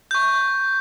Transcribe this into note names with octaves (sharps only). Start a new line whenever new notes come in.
C#6 G6